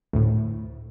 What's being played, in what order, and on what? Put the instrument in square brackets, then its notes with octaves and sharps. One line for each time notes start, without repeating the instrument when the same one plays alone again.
[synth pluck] D2 A2